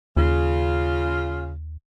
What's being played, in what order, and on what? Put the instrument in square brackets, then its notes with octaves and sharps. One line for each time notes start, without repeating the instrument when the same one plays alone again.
[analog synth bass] D#2 [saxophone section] C#3 F4